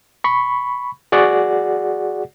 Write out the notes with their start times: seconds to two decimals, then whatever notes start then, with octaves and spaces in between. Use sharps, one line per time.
0.24 B5 C#6
1.12 F#4 G#4 D5 F#5